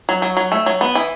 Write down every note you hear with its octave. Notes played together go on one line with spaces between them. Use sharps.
F#3
F#3
F#3
A3
F#3
B3
E3